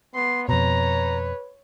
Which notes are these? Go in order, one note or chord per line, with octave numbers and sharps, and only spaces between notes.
B3 C6
F2 B2 B4 C#5 A#5